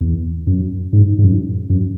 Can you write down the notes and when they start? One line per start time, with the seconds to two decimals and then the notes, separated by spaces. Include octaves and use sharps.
0.01 E2
0.47 F#2
0.93 G#2
1.19 G#2
1.24 F#2
1.70 F#2